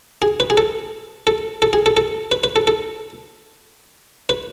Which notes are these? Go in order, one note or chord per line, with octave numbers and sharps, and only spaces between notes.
G#4
B4
G#4
A4
A4
A4
G#4
A4
A4
B4
B4
A4
A4
B4